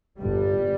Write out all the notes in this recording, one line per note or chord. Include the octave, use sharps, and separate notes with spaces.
G1 G2 G3